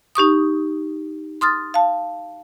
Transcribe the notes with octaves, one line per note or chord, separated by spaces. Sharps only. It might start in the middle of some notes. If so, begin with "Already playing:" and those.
D#4 G4 C#6 D#6
C6 D#6 F6 A6
F5 A5